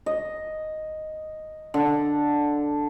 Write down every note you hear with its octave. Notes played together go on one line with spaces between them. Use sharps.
D#5
D3